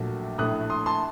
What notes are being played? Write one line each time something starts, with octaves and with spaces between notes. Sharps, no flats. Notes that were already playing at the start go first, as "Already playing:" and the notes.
Already playing: A#1 A#2 F#3 A3
A#1 A2 A3 D#6 F#6
C6 D#6
A5 C6